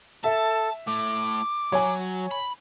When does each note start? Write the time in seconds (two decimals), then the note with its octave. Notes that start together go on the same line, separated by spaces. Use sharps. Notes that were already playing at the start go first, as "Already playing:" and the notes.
0.24 A4 E5 A5
0.87 A2 D6
1.72 F#3 C#5 G#5
2.31 B5